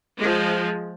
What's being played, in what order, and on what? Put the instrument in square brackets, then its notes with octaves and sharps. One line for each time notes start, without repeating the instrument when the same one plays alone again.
[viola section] F3 G#3